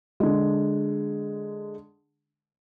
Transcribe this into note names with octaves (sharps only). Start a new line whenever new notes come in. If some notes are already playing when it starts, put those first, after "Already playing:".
D3 G#3